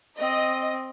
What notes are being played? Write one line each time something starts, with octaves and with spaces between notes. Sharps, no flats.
C4 D#5